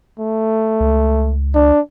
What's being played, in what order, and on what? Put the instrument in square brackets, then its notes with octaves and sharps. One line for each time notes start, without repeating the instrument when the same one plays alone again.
[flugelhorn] A3
[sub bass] C#2
[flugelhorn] D4